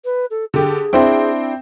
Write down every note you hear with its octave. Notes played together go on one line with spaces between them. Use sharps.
B4
A4
D3 G4 G#4
C4 D4 E4 C5 G5